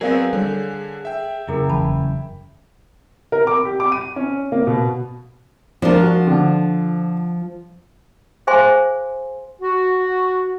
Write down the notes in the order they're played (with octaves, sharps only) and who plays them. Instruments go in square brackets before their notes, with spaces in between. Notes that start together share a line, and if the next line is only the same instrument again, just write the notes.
[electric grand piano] F#3 B3 C4 [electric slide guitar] G#4 [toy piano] A#4 D5 F5
[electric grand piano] D3 [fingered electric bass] G3 [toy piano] A4 C#5
[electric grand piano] E5 G5
[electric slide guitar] F#2 C#3 [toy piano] E4 G#4 A#4
[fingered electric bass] E1 E3 [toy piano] A5 B5
[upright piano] A#4
D6
G4
D6
D#7
C#4
A#3
B2
[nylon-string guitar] F3 F4 [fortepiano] D4 A#4
[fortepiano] F#4
D3
[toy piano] G#4 C5 F5 G#5 C6
[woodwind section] F#4